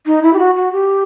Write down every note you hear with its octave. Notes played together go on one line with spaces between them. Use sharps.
D#4
E4
G4
F#4
F#4
G4